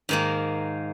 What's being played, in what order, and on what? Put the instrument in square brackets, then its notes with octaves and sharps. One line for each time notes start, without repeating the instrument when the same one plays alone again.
[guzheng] G#2 D#3 A#3